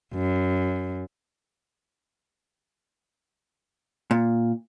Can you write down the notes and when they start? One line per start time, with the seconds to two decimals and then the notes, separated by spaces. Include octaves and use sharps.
0.14 F#2
4.11 A#2